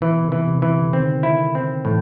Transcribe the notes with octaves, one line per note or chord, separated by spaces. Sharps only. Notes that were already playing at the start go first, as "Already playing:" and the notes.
B2 E3
C3
E3
C3
E3
D3
D#3 C4
E4
C4
A2 E3